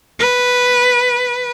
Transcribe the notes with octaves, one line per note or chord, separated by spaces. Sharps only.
B4